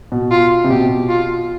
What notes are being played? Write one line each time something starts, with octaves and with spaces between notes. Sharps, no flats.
B2
F4
C3
B2 G4
F4